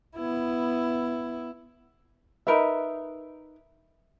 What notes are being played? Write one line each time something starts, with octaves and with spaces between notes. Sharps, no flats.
B3 E4
D#4 A#4 B4 E5